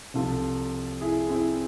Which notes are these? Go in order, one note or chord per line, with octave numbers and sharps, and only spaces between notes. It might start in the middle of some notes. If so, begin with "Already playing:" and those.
C2 C3 F3 F4 A4
E4 G#4
C4 E4